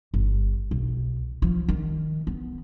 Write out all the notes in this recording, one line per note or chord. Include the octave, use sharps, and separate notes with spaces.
G1
B1
F3
D#3
B3